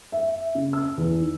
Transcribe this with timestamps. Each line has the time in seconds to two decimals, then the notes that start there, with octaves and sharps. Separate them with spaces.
0.12 E5
0.55 C#3
0.73 E6
0.97 E2
1.21 D#3